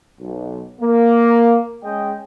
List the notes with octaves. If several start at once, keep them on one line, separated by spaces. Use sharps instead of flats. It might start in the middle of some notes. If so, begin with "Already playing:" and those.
B1
A#3
G#3 C#4 D#5 G5